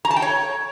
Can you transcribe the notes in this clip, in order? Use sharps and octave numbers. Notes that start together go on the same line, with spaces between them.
A#5
A5
G5
C#5